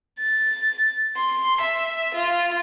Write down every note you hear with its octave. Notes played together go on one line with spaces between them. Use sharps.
A6
C6
E5
F4